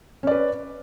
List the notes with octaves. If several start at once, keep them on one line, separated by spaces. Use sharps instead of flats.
C#4 B4 D5